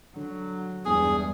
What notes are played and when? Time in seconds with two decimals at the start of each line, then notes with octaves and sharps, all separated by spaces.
0.16 D3 F#3
0.85 E1 E2 G2 G#4